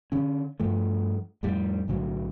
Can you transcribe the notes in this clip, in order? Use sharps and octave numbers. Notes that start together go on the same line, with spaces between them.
D3 C#4
G2 F3 A3
F2 A2 G3
B1 A2 D3 F#3